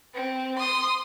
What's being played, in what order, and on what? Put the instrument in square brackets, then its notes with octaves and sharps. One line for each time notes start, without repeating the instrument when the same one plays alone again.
[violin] C4
C6 D#6